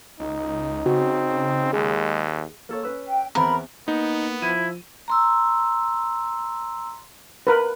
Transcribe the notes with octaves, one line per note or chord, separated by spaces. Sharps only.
C#2 D#4
C#3 C4 F#4
D#2 G#3 G#4
A#3 A4 C#5
C#4 B4 E6
G5
E2 B3 C4 A#4 B5
A#3 B3 D#4
F3 E4 D#7
A#5 C6 E6
A#4 B4